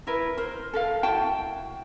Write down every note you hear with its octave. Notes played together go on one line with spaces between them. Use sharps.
E4 A#4 B4
A#4 C5
A4 A#4 F5
E4 F#4 G5 A5